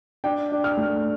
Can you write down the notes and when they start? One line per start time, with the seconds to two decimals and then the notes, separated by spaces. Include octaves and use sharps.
0.24 D4 G5
0.52 D4
0.64 F6
0.77 A3